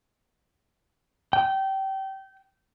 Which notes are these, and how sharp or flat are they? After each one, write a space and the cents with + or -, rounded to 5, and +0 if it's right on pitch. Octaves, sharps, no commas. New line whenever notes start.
G5 -25